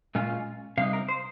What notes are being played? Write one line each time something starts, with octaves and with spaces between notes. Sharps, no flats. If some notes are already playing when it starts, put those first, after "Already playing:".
A#2 G#3 C#4 F4
C3 G3 D#4 F5
A#4
C5